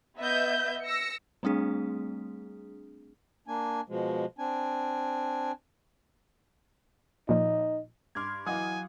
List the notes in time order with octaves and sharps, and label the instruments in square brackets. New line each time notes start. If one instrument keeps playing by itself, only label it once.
[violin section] B3 D#5 E5 G6
E6 A#6 C#7
[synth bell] G3 A3 C4 D4 G#4
[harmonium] A#3 D4 G#5
B2 F3 G#3
C4 D4 G#5
[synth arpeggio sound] A#2 F3 [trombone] D#4
[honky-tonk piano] G2 F6 [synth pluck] C6 D6 G#6
[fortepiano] E3 D#5 [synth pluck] F#3 [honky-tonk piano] F5 F#5 D#6 [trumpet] G#5